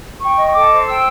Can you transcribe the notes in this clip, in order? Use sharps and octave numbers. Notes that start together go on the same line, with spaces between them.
G5 C#6
D#5
C#6
A4 D6
C5
G5 E6